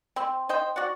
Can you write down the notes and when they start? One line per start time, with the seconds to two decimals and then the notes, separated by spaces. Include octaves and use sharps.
0.16 C4 C5
0.49 C5 D#5 G5
0.76 F#4 D5 F#5